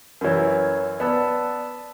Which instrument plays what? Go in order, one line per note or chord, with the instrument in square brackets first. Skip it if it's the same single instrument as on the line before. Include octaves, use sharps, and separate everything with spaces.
[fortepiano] F#2 E3 [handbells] A#4 C#5
[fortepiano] B3 [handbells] D5 A5 E6